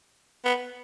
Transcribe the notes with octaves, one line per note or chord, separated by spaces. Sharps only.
B3